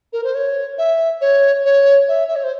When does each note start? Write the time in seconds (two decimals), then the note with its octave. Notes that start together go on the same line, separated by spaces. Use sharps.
0.13 A#4
0.24 C5
0.35 C#5
0.78 E5
1.21 C#5
1.65 C#5
2.08 E5
2.28 E5
2.36 C#5
2.44 C5